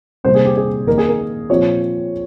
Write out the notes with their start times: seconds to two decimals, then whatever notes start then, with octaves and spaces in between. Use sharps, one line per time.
0.24 C3 D#3 G3 A#3 C5
0.34 G#4
0.45 G4
0.56 G#4
0.87 D#3 A#3 D#4 A#4
0.98 G#4
1.09 A#4
1.49 A#2 F3 C4 C#5